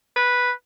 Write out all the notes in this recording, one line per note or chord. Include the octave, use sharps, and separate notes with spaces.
B4